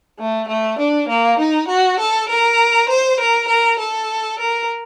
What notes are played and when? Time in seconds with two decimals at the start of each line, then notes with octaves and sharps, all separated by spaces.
0.18 A3
0.47 A3
0.78 D4
1.08 A#3
1.38 D#4
1.67 F#4
1.98 A4
2.28 A#4
2.88 C5
3.19 A#4
3.48 A#4
3.78 A4
4.38 A#4